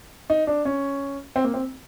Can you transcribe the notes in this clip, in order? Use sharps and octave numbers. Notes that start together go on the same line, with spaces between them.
D#4
D4
C#4
C4
A#3
C4